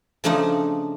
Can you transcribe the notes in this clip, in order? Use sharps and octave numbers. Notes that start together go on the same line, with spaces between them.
C#3 F3 A3 D4 D#4